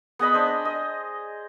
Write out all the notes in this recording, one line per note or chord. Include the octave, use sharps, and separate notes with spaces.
B3 G#4 D#5 B5
D4 C5 D#5
D#5